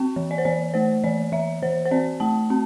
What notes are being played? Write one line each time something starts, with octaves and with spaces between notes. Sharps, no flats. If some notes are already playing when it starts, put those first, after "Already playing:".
Already playing: C4 G5
E3
D5
C5
E3 D5
A3 C5
E3 D5
E3 E5
E3 C5
C5
C4 D5
A3 A5
C4